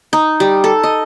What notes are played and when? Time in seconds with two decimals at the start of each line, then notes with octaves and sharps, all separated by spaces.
0.13 D#4
0.40 G3
0.64 A4
0.84 D#5